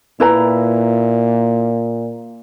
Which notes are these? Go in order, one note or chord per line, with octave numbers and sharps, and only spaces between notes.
A#2 E4 B4 A#5